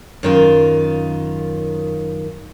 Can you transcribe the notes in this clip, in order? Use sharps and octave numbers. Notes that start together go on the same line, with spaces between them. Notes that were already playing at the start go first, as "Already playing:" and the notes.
F#2 D#3 F4